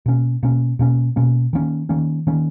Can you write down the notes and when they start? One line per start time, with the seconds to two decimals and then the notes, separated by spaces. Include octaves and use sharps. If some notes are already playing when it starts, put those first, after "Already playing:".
0.06 B2 A#3 C#4
0.43 B2 A#3 C#4
0.79 B2 A#3 C#4
1.16 B2 A#3 C#4
1.53 D#3 A#3 C#4
1.89 D#3 A#3 C#4
2.27 D#3 A#3 C#4